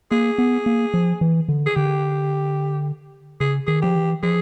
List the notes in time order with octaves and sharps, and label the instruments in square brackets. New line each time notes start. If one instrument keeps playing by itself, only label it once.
[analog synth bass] A#3 [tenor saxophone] G#4
[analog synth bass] B3
A#3
F3
E3
D3
[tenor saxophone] G#4
[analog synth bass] D3 [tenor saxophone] G4
[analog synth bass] C#3 [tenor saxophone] G#4
[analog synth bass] D#3 [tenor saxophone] G#4
[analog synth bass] F3 [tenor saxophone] G4
[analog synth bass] E3
[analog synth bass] F3 [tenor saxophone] G#4